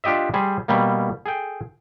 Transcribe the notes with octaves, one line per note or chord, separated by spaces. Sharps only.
D4 F4 G4 D#5 E5
G3 G#4 C5
B2 G3 A#3
G#4 A4 G5